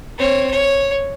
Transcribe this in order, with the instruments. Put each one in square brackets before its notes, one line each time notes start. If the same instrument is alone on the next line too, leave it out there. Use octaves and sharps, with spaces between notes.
[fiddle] C4 C#5
C#5